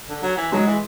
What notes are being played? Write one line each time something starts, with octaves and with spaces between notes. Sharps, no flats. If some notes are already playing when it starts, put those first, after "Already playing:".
D3
F#3
E3
F#3 G#3
E3